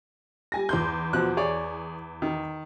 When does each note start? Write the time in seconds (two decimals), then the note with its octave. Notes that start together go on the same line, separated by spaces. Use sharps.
0.52 G3 G#5 A#6
0.69 E2 C6 G6
1.13 B2 F3 F#6
1.37 G#4 C#5 D5
2.22 D#3